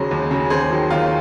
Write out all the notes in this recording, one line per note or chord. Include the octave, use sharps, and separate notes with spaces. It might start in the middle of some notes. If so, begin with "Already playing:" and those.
Already playing: D#2 C#3 F#3 G#4 C5
D#2
C#3 F#3
D#2 G#4 C5
D#3 F#3
D#2 F4